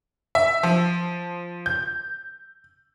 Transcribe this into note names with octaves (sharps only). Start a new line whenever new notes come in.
E5
F3
G6